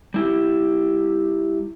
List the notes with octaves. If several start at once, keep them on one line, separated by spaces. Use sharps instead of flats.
G3 E4 G4